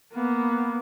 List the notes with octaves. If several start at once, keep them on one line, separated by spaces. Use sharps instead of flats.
A#3 B3